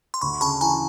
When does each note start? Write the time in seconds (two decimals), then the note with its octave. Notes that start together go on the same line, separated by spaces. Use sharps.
0.14 C6
0.21 D2 B5 C#6
0.41 C#3 A5 B5
0.61 E3 G#5 A#5